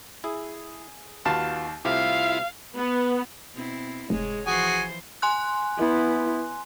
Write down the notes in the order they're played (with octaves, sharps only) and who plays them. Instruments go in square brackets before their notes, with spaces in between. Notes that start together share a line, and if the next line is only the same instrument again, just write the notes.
[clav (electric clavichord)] E4 [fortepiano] G#4
[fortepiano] D#2 F5 A5 [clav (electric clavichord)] F4 F#4 B4
[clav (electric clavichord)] C2 C3 A3 [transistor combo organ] E4 F4 [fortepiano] G4 [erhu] F5
[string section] B3
[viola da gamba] B2 C4 E4
[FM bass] F1 [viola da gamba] G#2 G#3 C#5
[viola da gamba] E3 F3 C5 [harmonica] F#4 G#4 G#5
[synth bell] G#5 C6 F#6
[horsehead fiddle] B3 E4